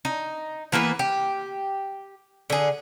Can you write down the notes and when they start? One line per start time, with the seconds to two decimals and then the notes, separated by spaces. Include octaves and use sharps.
0.05 D#4
0.72 E3 A#3 B3 B4
0.99 G4
2.50 D3 G#4